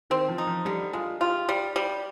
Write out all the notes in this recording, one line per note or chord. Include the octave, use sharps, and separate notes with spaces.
D#3 C4
F3
D#4
F3
D3 G3
G#3 F4
F4 G4
G3 G4
G3